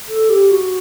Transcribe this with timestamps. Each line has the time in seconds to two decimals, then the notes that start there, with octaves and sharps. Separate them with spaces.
0.08 A4
0.29 G4
0.50 F#4